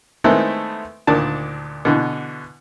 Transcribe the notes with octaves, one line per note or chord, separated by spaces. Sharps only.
D#3 G#3 A3 B3 C4 E4
D2 A#2 D#3 D4 A5
B2 D3 E3